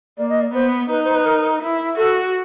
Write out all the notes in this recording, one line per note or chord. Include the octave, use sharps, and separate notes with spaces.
A#3 D5
D#5
D5
B3 C5
D#4 B4
C5
B4
A#4
E4
F#4 A4